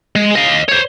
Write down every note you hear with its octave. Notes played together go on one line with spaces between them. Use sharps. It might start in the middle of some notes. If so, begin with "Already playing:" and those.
G#3
D#5 F5
C5 C#5